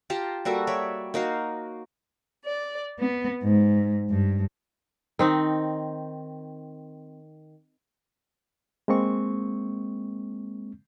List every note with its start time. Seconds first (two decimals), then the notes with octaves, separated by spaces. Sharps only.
0.10 F4 G4 A5 A#5
0.45 G3 A#3 F#4 A4
0.67 C#5 D5 E5
1.14 A#3 D#4 F#4 F5
2.44 D5
2.98 B3
3.41 G#2
4.09 G2
5.19 D#3 C4 D#4
8.88 G#3 A#3 C4 C#6